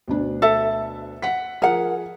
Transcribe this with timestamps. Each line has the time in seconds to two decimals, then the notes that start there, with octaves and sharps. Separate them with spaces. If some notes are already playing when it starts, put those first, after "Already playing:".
0.08 D2 B2 D4
0.42 A4 E5
1.22 F#5 B6
1.62 F3 G#4 A#4 F#5